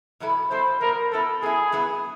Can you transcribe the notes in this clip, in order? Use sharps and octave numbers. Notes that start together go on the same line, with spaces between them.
B2 F#3 B3 E4 A4
B2 F#3 B3 E4 A4 C5
B2 F#3 B3 E4 A4 A#4
F#3 B3 E4 A4
F#3 B3 E4 G#4
F#3 B3 E4